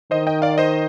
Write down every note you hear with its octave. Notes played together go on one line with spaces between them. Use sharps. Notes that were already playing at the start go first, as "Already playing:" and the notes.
D#3 C5 D#5
D#5 G5
D5 F5
C5 D#5